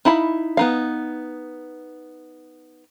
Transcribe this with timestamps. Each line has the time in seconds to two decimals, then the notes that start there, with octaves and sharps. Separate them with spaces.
0.05 D#4 E4 F5 B5
0.57 B3 D#4 F5